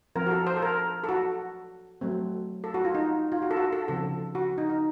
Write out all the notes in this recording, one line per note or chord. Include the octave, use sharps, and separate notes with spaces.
F3 C4 A#4
F#4
A4
C5
A4
A#4
A4
F#4
F#3 A3 C4
A4
F#4
F4
D#4
F4
F#4
A4
F#4
A4
C#3 F3 C4 A4
F#4
D#4
D#4